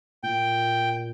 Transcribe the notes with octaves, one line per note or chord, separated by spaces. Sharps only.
A#2 G5